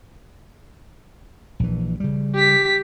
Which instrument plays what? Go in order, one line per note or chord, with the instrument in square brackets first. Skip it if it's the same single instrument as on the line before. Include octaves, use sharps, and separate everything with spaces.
[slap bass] A#1 E3
C#3 G3
[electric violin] G4 B6